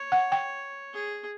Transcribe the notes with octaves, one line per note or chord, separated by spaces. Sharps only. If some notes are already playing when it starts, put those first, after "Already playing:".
Already playing: C#5
F#5
G5
G#4